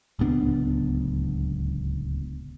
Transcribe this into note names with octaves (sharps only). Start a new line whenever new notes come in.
D1 C#2 B3 D4